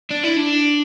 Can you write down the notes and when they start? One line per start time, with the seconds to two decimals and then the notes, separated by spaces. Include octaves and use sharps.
0.11 D4
0.24 E4
0.37 D4